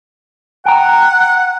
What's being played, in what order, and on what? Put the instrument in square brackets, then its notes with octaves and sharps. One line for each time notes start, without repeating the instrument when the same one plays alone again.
[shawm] F#5 [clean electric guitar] G5 A#5